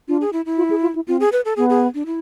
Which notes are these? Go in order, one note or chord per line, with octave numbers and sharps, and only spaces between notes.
D4 F4
G#4
E4
E4
F4
G#4
F4
E4
C4 F4
G#4
B4
A4
B3 G#4
G#4
D4
E4